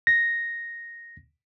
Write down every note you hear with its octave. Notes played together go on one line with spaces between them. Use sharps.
A#6